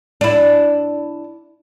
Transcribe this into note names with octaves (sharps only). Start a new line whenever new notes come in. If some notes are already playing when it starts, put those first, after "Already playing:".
D4 E4